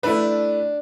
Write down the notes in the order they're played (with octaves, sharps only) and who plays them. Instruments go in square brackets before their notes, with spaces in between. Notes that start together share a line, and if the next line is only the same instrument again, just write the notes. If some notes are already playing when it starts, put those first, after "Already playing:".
[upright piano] A3 E4 B4 [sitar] D4